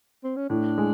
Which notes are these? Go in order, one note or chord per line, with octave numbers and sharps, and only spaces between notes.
C4
C#4
A2 D4
G#3